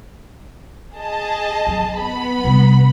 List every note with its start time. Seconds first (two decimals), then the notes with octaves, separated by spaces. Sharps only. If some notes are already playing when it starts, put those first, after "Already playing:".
0.97 G#4 D#5 A5
1.67 F#3 C#4
1.97 B3 B5
2.44 C3 G3